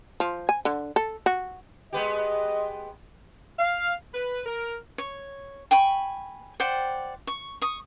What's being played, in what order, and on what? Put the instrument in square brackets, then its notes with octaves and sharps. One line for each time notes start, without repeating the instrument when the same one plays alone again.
[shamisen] F3
G#5
D3
A4
F#4
[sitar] G#3 B3 G4 [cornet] D#5
[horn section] F5
B4
A#4
[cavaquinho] C#5
G5 G#5 B5 C#6
C5 D5 F#5 G5
C#6
C#6 D#6